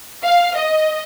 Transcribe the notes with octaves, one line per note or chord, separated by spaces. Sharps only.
F5
D#5